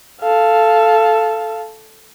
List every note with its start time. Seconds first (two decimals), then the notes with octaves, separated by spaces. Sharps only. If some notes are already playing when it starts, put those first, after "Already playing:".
0.21 A4 F5